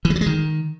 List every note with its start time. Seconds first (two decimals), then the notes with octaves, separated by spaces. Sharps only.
0.05 E3
0.10 G#3
0.16 F#3
0.21 G#3
0.26 D#3